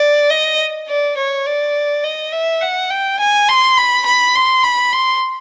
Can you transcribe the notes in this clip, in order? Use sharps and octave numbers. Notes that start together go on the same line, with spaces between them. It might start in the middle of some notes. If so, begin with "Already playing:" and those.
Already playing: D5
D#5
D5
C#5
D5
D#5
E5
F#5
G5
G#5
C6
B5
B5
C6
B5
C6